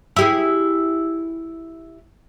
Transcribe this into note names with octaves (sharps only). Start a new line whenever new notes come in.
E4 G4 G#4